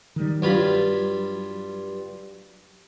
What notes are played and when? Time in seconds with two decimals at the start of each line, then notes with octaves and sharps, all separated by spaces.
0.16 D#3 G3
0.42 G2 F#3 F4 B5